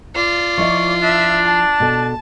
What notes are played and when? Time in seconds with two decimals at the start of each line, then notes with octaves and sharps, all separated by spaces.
0.16 F4 D5
0.58 F3 E4 D#5 C#6
1.02 D4 E5
1.45 A5
1.80 B2 A4